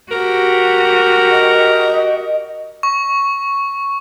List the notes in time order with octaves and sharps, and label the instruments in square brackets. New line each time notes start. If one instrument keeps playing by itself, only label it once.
[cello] F#4 G4 [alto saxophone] A#4
[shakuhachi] D#5
[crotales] C#6